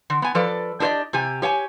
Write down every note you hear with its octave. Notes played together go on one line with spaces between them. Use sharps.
D3
B3 G#5
F3 A4 B4 D5
D4 G4 A4 C5 D5 D#5
C3 G4 G#5
G4 C#5 F#5 G#5